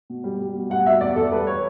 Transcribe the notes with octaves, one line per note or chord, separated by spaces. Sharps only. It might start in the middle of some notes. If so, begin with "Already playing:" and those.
B2
G3
G3
B2
G3 F#5
B2 E5
E2 D5
E2 A4
G3 B4
C#5